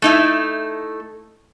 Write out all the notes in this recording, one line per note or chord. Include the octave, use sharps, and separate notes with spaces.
A3 D#4 E4